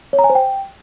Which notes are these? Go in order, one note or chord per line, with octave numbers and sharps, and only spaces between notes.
C#5
A#5
G#5
C5
G5